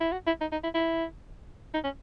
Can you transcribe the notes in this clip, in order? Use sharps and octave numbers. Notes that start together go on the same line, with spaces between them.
E4
F#4
E4
D#4
D#4
E4
E4
D#4
C#4